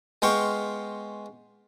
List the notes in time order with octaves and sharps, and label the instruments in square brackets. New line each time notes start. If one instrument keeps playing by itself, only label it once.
[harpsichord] G#3 B3 F4 G5 C6 C#6